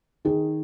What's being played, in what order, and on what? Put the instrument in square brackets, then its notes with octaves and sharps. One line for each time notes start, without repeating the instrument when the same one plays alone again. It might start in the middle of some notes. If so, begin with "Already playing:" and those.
[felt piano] D#3 G#4